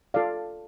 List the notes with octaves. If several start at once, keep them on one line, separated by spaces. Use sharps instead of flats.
F4 A4 D5 F5